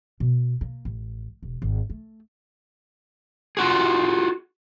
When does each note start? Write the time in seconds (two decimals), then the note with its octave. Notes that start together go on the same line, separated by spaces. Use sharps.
0.20 B2
0.61 A#3
0.85 A1
1.43 E1
1.62 G#1
1.90 A3
3.57 F4 F#4 G#4